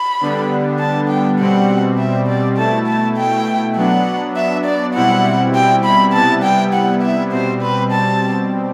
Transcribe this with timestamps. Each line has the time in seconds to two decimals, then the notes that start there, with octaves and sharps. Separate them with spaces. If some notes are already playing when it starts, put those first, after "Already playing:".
Already playing: B5
0.21 D3 G3 B3 D4
0.79 A5
1.09 G5
1.39 B2 G3 C4 F#5
1.98 E5
2.28 D5
2.57 B2 A3 E4 A5
2.87 A5
3.17 G5
3.76 F#3 B3 D4 F#5
4.36 E5
4.65 D5
4.94 B2 G3 C4 E4 F#5
5.54 G5
5.84 B5
6.13 C3 G3 B3 E4 A5
6.43 G5
6.74 F#5
7.02 E5
7.33 B2 G3 C4 C5
7.62 B4
7.92 A5